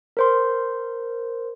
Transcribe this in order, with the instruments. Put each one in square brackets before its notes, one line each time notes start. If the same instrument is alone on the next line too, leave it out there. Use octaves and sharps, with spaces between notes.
[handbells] A#4 C5 C6